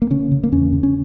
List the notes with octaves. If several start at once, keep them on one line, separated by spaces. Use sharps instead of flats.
A#3
C#3 C#4
C#3
A#3
E2 C#4
C#3
C#4